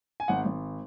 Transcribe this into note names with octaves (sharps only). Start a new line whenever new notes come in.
G#5
G#1 F#5
G#1